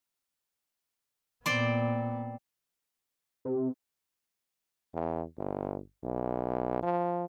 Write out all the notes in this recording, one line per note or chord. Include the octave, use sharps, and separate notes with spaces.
A#2 B3 C4 D5 C6
C3
E2
G1
B1
F3